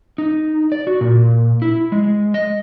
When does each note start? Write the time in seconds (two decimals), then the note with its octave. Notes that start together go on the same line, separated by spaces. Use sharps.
0.18 D#4
0.72 D5
0.87 F#4
1.01 A#2
1.62 E4
1.92 G#3
2.34 D#5